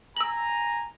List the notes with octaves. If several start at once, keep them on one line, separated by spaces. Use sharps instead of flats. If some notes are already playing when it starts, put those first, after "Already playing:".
G#5 A#5 E6 F#7